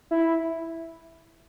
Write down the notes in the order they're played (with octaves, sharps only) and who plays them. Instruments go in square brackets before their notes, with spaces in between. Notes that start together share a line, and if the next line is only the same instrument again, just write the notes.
[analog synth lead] E4